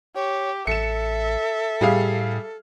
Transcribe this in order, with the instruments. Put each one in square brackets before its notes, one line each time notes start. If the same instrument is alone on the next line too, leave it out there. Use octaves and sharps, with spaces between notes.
[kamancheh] G4 [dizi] C#5
[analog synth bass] A1 [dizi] A4 [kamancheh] E5 [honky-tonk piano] C#7 E7
[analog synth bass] A2 [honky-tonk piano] G3 G#4 F5